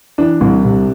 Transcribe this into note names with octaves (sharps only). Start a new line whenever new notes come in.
E3 D4
C2
C3